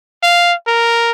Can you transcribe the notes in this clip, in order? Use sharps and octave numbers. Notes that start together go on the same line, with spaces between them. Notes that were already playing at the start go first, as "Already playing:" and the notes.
F5
A#4